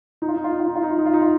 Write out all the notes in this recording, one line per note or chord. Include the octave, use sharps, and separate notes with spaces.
D#4
F4
D#4
F4
D#4
F4
D#4
F4
D#4
F4
D#4
F4
D#4
F4